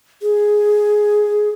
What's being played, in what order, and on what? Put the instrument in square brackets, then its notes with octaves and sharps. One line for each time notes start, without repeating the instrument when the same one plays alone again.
[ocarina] G#4